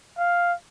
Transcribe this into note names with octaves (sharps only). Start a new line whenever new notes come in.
F5